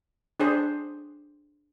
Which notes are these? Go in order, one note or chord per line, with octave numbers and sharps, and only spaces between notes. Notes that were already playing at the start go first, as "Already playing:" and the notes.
D4 G#4 C5